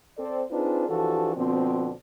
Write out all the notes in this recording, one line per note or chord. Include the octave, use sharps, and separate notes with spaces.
C4 A4 D5
C4 D4 D#4 F4 G#4 B4
E3 F3 D4 F#4 G4 A4
B2 D3 F3 C4